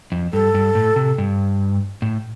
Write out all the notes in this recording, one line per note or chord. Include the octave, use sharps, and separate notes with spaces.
F2
G2 A4
G2
A2
C3
G2
A2